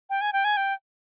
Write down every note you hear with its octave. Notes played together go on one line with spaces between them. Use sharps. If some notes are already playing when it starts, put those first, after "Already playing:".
G5
G#5
G5
G#5
G5